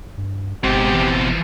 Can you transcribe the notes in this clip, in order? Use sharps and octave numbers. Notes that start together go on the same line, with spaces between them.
G2
G1 G#2 B2 C4 G4
E3 F3